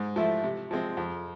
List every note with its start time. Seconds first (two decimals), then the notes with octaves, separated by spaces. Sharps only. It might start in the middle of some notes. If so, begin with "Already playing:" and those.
Already playing: G#2
0.16 F3 A3 E4
0.44 C3
0.71 F3 G#3 C4
0.97 F2